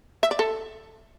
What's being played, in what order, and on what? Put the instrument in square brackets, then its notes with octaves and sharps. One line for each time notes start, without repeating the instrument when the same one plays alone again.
[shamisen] E5
D5
A4